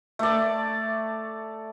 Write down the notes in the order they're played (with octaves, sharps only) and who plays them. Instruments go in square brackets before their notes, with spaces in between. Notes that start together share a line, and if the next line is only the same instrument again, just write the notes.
[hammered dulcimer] A3 D5